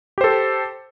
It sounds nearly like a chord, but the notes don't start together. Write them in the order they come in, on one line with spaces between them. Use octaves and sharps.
G4 C5 A4